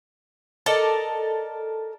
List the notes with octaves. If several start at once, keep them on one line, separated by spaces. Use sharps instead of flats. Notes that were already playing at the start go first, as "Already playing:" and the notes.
A4 A#4 D5 D#5